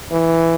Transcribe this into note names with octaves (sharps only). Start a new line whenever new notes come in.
E3